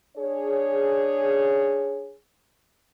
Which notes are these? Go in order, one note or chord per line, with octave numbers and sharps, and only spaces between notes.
D4 G#4 C#5